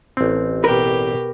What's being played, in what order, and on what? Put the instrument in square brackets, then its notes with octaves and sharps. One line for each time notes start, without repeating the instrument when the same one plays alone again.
[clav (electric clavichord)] A1 C4
[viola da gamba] B2 G4 [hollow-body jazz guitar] A#4 B4